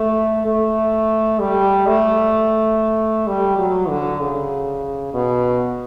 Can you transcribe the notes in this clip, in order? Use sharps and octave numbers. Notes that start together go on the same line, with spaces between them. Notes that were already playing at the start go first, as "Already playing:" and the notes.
Already playing: A3
A3
G3
A3
G3
F#3
D3
C#3
B2